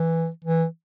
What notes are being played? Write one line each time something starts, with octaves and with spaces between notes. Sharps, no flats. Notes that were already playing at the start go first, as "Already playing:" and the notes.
Already playing: E3
E3